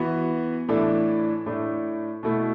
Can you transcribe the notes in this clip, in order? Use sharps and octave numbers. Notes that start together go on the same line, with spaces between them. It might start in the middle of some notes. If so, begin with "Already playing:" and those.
Already playing: E3 B3 F#4
A2 E3 D4 A4
A2 A3 D4
B2 A3 E4 A4